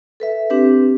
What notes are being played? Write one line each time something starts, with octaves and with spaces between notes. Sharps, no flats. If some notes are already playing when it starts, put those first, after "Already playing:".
A4 B4 E5
C4 D4 G4 B4